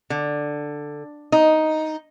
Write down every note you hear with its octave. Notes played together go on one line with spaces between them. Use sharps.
D3
D#4